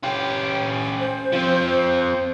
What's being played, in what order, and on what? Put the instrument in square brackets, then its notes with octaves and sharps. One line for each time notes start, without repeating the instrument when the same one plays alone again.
[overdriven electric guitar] C#4 G4
[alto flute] C5
[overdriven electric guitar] F3 C4